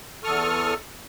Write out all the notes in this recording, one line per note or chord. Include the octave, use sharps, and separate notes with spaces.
E2 A4 C#6 D#6 F6